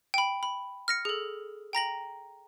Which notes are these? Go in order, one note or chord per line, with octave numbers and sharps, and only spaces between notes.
G5 B5
B5
F6 A#6 C#7
G#4 A4
G5 A#5 A#6 F#7